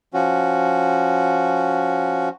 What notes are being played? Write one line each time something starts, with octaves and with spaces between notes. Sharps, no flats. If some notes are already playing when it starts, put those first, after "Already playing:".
F3 C#4 F#4